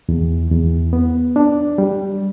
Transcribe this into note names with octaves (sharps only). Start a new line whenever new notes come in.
E2
E2
B3
D4
G3